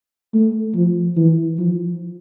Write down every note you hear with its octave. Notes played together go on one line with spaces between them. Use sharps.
A3
F3
E3
F3